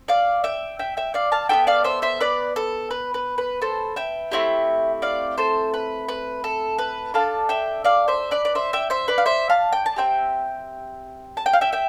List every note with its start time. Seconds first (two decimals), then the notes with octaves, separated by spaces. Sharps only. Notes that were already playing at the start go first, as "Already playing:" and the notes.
Already playing: C4
0.08 D5 F5
0.44 E5 G5
0.79 E5 G5
0.97 E5 G5
1.14 D5 F5
1.32 F5 A5
1.49 B3 F4 A4 E5 G5
1.67 D5 F5
1.84 C5 E5
2.02 C5 E5
2.21 B4 D5
2.56 A4
2.91 B4
3.14 B4
3.38 B4
3.62 A4 C5
3.96 E5 G5
4.32 A3 C4 E4 G4
5.02 D5 F5
5.38 A4 C5
5.74 B4
6.08 B4
6.44 A4
6.78 B4
7.14 D4 A4 F5 A5
7.49 E5 G5
7.84 D5 F5
8.08 C5 E5
8.31 B4 D5
8.45 D5
8.55 C5 E5
8.73 E5 G5
8.90 C5 E5
9.08 B4 D5
9.18 F5
9.26 C5 E5
9.50 F5 A5
9.72 G5
9.86 A5
9.96 C4 G4 E5 G5
11.37 A5
11.46 G5
11.53 F5
11.61 E5 G5
11.72 E5 G5